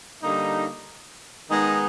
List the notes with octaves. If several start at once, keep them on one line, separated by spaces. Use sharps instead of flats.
D3 G3 A#3 D#4
D#3 G#3 B3 D#4